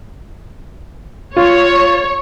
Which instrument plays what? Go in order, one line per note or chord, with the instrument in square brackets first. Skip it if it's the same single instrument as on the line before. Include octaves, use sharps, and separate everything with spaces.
[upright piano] F4 [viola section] C#5